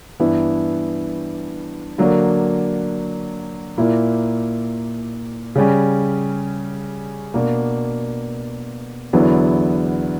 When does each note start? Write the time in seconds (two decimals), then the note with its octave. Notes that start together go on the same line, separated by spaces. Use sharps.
0.20 G2 E3 B3 E4
1.98 D3 F#3 A#3 D4
3.78 A#2 A#3 E4
5.55 C#3 G3 C#4
7.34 B2 A#3 D4
9.13 E2 D3 F#3 B3 E4